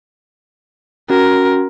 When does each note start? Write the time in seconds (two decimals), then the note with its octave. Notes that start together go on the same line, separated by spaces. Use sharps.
1.10 C#4 F#4 A#4